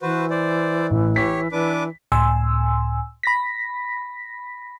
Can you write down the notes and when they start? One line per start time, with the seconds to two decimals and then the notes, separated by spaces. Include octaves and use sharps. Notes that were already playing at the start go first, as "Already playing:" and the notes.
0.02 E3 F#4 B4 C5
0.30 C5 D5
0.90 A1
1.16 G4 C#5 B6
1.52 E3 D4 B4 D6
2.12 C#2 A2 G#5 C6 E6
3.23 B5 A#6 B6